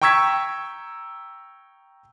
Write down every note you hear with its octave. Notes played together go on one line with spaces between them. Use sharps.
G5 A#5 C#6 E6 G#6 B6